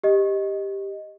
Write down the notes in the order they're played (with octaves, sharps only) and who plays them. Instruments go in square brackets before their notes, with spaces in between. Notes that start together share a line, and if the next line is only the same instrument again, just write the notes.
[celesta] G4 D#5